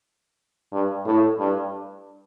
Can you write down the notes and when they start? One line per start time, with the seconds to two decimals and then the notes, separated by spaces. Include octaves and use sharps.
0.72 G2
1.06 A2
1.39 G2